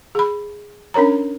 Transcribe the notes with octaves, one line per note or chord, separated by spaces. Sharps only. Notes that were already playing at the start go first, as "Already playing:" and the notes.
G#4 B5
C#4 D4 A#4 C#5 A#5